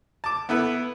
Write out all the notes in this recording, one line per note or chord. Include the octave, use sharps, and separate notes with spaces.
A5 D6
B3 E4 A4 B4